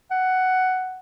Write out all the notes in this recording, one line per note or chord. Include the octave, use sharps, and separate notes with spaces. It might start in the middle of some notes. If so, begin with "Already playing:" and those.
F#5